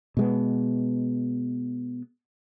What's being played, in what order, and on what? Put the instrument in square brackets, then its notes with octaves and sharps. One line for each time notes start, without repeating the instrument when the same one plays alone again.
[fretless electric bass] B2 G#3 B3